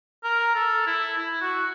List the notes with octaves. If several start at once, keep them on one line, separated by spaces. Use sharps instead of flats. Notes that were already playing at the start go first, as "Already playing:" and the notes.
A#4
A4
E4
E4
F#4